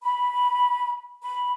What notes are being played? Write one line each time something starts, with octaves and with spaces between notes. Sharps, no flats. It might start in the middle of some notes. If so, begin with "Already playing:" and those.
B5
B5